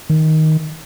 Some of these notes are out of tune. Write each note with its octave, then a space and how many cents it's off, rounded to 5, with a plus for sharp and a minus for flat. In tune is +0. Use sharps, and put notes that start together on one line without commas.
D#3 +10